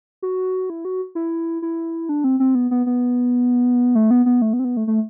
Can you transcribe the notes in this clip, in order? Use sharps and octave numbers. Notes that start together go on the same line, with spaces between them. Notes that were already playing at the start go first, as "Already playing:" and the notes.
F#4
E4
F#4
E4
E4
D4
C4
C4
B3
B3
B3
A3
B3
B3
A3
B3
C4
B3
A3
A3